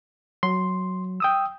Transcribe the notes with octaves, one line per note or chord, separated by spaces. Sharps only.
F#3 C6
G5 D#6 E6